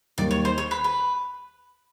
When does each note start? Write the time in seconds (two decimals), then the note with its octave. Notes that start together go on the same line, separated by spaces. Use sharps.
0.18 D#2 D#3 G3 D5
0.31 C#5
0.45 C5
0.58 C#5
0.71 B4
0.84 B4